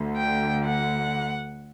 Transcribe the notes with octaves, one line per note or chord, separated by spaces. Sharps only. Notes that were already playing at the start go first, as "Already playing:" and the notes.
Already playing: D2 D3
G5
F#5